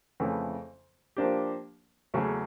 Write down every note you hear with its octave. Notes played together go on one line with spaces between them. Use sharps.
F2 C#3 E3 A3 C#4
F3 A#3 D4 G4
E2 C#3 F#3 A3 C#4